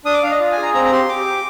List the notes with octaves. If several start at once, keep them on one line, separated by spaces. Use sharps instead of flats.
D4 D#6
D6
D4 F5
D#5
F4
G#5
G#4
A#5
C4 A#5
A#5
G4 C6
G4 D6
G4